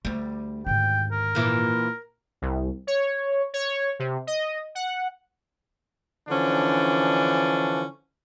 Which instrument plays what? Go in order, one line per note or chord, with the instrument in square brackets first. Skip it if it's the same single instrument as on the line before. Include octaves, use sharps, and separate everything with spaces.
[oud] D2 G3 [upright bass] A3
[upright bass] G#2 D#3 [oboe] G5
[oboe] A#4
[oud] A#2 E3
[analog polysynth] C2
C#5
C#5
C3
D#5
F#5
[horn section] D3 E3 F3 C#4 D4